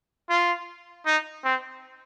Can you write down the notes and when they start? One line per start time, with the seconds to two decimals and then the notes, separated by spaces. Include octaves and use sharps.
0.30 F4
1.06 D#4
1.44 C4